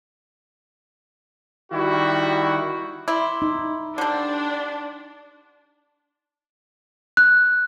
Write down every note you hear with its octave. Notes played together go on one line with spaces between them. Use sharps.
D#3 G3 E4 F#4
E4 D5 B5 C6
D#4
D3 G3 D4 C5
F#6